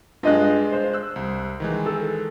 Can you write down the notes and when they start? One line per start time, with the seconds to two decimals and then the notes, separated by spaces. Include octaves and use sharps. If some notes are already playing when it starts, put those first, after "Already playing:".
0.23 G2 G#3 D4 F4 D#5 F#6
0.72 C5
0.93 E6 F#6
1.16 C2
1.60 D#3 E3 G#3
1.86 A4